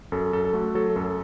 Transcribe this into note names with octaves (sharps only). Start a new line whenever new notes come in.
F#2 A4
F#2 A4
A4
A3 F#4
F#3 A4
F#2 A4